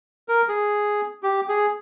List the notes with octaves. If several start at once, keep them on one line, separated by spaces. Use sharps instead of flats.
A#4
G#4
G4
G#4